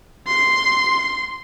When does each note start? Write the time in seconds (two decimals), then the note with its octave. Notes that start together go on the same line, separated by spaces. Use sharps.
0.27 C6